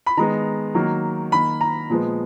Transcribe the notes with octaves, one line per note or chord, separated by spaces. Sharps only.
B5
D#3 G#3 B3 A#5
D#3 F#3 A#3
D#3 A#3 B5
A#5
A#2 F3 G#3 B3